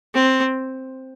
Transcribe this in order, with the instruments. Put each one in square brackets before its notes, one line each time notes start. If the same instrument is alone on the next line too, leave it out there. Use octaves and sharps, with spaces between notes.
[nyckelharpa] C4